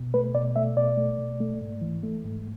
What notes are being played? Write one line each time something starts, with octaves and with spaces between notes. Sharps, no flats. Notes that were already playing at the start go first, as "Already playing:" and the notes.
Already playing: B2
A3 B4
B2 D5
A3 E5
B2 D5
A3
B2
A3
G#2
E3
A3
G#2